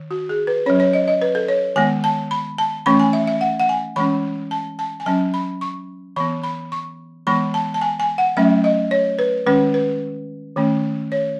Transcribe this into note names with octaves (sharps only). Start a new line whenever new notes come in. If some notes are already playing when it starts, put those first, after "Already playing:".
Already playing: D#3
F#4
G#4
B4
F#3 C#4 C#5
C#5
D#5
D#5
B4
A4
C#5
D#3 G#3 B3 G#5
A5
B5
A5
E3 A3 C#4 B5
G#5
E5
E5
F#5
F#5
G#5
E3 G#3 C#4 B5
A5
A5
G#5
F#3 C#4 A5
B5
C#6
E3 B3 B5
B5
C#6
E3 G#3 B3 B5
A5
A5
G#5
G#5
F#5
F#3 A3 C#4 E5
D#5
C#5
B4
D#3 G#3 C#4 B4
B4
D#3 A3 C#4
C#5